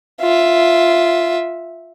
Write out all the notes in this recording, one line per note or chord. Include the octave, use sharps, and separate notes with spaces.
F4 E5